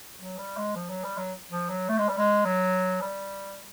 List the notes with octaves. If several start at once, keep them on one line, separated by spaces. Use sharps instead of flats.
F#3
G3
G#3
F3
F#3
G3
F#3
F3
F#3
A3
G#3
G3
G#3
F#3
G3